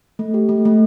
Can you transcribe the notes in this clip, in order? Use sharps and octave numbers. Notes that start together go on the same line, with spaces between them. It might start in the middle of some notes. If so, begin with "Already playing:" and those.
A3
G4
A3
A3